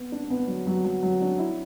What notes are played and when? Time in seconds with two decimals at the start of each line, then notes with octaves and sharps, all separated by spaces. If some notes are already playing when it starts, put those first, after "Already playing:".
Already playing: B3
0.12 D4
0.30 B3
0.47 F#3
0.67 F#3
0.84 F#3
1.03 F#3
1.21 D4
1.39 E4